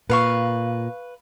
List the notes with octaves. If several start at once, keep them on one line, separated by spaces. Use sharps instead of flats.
A#2 B4 F5 C#6